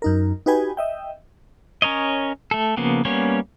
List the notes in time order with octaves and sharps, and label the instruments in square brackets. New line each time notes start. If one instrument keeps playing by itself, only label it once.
[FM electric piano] F#2 D#4 A#4
D#4 F#4 G4 B4 G5 G#5
D#5 E5 G5
[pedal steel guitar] C#4 A#4 C#5 D#5
A3 A4
C#3 F3 A#3 B3
G3 A#3 B3 C#4 C#5